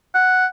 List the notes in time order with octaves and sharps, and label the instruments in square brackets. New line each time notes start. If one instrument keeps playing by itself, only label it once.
[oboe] F#5